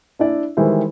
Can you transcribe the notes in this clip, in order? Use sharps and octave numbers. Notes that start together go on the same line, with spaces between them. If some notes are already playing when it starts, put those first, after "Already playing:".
D4 E4 D5 E5
D#3 E3 G3 G#3 E4 C5